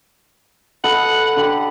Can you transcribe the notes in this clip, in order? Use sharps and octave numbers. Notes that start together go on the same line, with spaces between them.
A4 D#5 F#5 B5 F#7
D3 G4